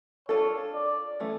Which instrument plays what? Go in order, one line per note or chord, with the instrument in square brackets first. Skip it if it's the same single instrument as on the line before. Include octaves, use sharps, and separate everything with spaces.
[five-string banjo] D4 F4 A4 [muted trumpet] C#5
[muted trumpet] D5
[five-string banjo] E3 A3 C#4